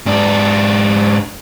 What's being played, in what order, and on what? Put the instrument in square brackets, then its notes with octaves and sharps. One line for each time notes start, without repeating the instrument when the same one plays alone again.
[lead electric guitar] G#2 D4